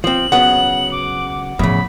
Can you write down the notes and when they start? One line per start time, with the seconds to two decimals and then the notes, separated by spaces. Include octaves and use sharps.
0.04 F3 C4 F#7
0.32 C#3 F#3 B3 F#5
0.92 D6
1.59 E2 A2 C#3 F3 B5